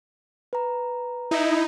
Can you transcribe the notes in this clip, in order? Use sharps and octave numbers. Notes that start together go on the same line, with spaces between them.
B4 A#5
D#4 E4